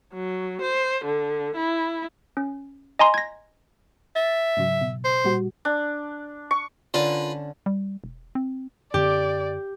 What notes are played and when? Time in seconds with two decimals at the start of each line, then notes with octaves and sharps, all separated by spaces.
0.14 F#3
0.62 C5
1.05 D3
1.56 E4
2.37 C#4
2.99 D#5 G#5 A#5 C6
3.14 G#6 A#6
4.16 E5 A6
4.57 G#2 C#3 F#3
4.81 B2
5.05 C5
5.24 A#2 G3 F#4
5.65 D4
6.51 C#6
6.94 D3 C#4 F4 A#4 B4 A5
7.66 G3
8.04 E1
8.35 C4
8.94 F#2 D3 C4 G4 D5